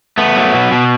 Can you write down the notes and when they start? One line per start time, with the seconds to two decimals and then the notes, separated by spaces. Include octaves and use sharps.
0.18 A3 B3
0.36 F#3
0.54 B2
0.72 B2